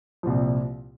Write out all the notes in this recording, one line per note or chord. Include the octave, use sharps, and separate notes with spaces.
C2 A#2 F3